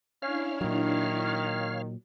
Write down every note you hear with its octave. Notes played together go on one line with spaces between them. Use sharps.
C#4 D4 E4 C#5 F5 F6
A#2 D#3 F#3